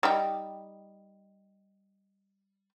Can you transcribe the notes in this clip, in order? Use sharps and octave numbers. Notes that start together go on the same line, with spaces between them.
G3 D#4 G5